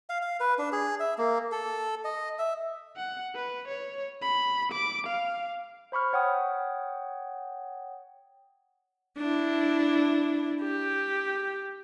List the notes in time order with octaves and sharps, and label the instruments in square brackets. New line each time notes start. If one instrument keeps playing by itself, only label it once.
[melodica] F5
F5
B4
D4
G#4
E5
A#3
A4
D#5
E5
[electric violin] F#5
B4
C#5
B5
D6
F5
[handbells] C5 B5 C#6 F6
C#5 F#5 G5 D#6
[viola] D4 E4
G4